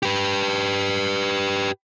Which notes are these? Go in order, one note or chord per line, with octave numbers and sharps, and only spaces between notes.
G4 B4